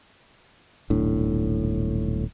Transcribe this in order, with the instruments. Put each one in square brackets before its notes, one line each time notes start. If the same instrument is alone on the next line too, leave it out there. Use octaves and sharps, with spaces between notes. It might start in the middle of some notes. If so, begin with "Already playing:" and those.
[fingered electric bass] D#1 B1 A2 D4